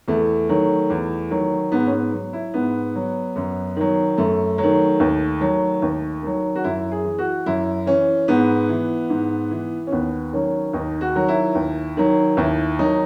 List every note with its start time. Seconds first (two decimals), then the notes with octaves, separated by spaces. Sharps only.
0.08 E2 A3
0.49 D#3 F#3
0.90 E2
1.30 D#3 F#3
1.72 G#2 B3
1.87 C#4
1.92 B3
2.12 F#3
2.33 E4
2.54 G#2 B3
2.95 F#3
3.36 F#2
3.76 D#3 F#3
4.18 F#2 A3
4.58 F#3
4.63 D#3
5.00 D#2
5.40 D#3 F#3
5.82 D#2
6.22 D#3 F#3
6.55 F#4
6.64 F#2 E4
6.92 G#4
7.05 E3
7.18 F#4
7.46 F#2 E4
7.87 E3 C#4
8.28 G#2 B3
8.69 E3
9.10 G#2
9.51 E3
9.87 C#4
9.92 D#2 B3
10.33 D#3 F#3 C#4
10.73 D#2 D#4
11.01 F#4
11.15 D#3 F#3
11.28 E4
11.55 D#2
11.97 D#3 F#3
12.37 D#2 E4
12.79 D#3 F#3 D#4